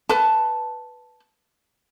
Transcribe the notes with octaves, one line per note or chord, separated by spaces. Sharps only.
B4 A5